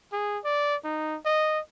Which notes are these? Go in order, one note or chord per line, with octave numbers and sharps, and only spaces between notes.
G#4
D5
D#4
D#5